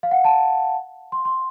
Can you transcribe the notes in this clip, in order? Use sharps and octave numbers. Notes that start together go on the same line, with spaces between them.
F5
F#5
A5
C6
C6